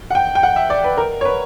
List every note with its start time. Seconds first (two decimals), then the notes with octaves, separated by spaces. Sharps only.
0.11 F#5
0.15 G5
0.35 G5
0.43 F#5
0.56 E5
0.70 D5
0.84 B4
0.97 A#4
1.21 C#5
1.25 B4